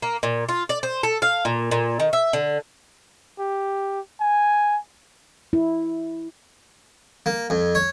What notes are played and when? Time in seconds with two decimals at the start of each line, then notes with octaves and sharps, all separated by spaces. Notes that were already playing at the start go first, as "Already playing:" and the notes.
0.02 A#3
0.23 A#2
0.49 F4
0.69 D5
0.83 C5
1.03 A4
1.22 F5
1.45 A#2
1.71 A#2
2.00 D#3
2.13 E5
2.33 D3
3.39 G4
4.21 G#5
5.53 E4
7.26 A#3
7.50 F2
7.75 C#5